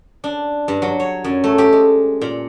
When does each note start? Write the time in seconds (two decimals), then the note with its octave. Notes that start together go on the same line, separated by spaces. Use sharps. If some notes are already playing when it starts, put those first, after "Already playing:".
0.24 D4
0.68 G2
0.82 F#3
1.00 C#5
1.24 F#2
1.44 A3
1.58 G4
1.73 G#3
2.21 A#2